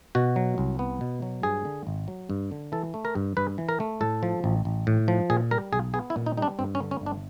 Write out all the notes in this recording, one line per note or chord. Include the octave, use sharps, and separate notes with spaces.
B2 F#4
F#3
C2
B3
B2
F#3
G2 G#4
D3
G#1
F#3
G2
D3
E3 A4
A3
A#4
G2
G2 B4
E3
A#4
A3
A2 A4
F3
A1
A1
A2
F3
A#2 G#4
G3 A#4
B1 G#4
B3 G#4
E4
A#2
D#4
G3 D#4
D4
G2 C4
C#4
D3
C#4
G1
D4